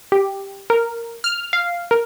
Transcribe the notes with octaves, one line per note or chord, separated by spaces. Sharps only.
G4
A#4
F6
F5
A#4